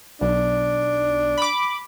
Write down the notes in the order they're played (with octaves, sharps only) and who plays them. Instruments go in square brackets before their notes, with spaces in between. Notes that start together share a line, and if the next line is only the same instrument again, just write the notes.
[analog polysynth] B1 [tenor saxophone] D4
[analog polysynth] B5 D6